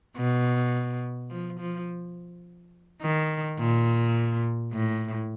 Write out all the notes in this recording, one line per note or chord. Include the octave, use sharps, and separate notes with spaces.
B2
F3
F3
D#3
A#2
A2